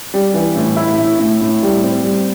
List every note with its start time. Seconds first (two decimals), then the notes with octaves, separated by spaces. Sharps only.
0.14 G3
0.34 E3
0.56 A2
0.76 E4
0.98 A2
1.19 A2
1.41 A2
1.63 G3
1.83 C4
2.04 G3